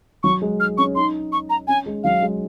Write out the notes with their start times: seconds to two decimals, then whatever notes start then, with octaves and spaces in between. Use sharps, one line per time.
0.23 F#3 C#6
0.42 G#3
0.60 F6
0.78 C#4 C#6
0.95 D#4 C6
1.32 C#6
1.50 A#5
1.68 C#4 G#5
1.86 G#3
2.04 F#3 F5
2.22 G#3